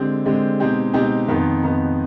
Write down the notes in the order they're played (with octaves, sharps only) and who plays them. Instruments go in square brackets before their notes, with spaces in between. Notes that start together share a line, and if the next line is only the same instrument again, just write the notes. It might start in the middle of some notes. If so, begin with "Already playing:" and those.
Already playing: [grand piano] D3 G#3 C4 G4
D3 G#3 C4 G4
B2 G#3 C4 D#4 G4
B2 G#3 C4 D#4 G4
F2 D#3 B3 D#4
F2 D#3 B3 D#4